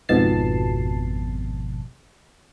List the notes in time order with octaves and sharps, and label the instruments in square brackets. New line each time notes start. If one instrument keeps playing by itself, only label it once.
[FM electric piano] G#1 F2 B2 A5 C7